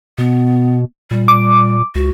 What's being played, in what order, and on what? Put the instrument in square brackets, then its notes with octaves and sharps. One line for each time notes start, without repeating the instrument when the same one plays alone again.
[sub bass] B2 [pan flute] B3
[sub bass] A#2 [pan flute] G3
[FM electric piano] D6
[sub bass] C#2 [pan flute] F#4